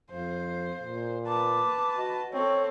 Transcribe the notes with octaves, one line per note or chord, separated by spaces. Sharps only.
F2 C5 F5
A#2
B4 A5 D6
F#4 D#5
C4 A4 C#5